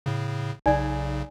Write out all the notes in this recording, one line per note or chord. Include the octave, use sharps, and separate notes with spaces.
A2 C#3
B1 C#3 D#4 D5 G#5